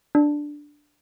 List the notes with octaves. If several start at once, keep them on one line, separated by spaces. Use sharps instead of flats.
D4